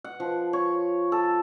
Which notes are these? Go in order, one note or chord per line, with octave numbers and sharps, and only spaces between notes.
F#5
F3
C#5
A4